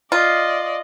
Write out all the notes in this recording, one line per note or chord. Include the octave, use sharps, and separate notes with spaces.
F4 D5 D#5